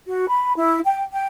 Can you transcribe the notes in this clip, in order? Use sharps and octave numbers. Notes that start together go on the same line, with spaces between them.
F#4
B5
E4
G5
G5